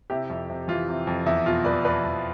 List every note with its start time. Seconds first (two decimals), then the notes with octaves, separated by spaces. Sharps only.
0.10 C3 E4 G4
0.30 F2
0.50 C3
0.68 E3 F4
0.88 C3
1.07 F2
1.26 E2 E4
1.46 B2 F4
1.65 E2 B4 D5
1.85 E2 B4 D5
2.04 E2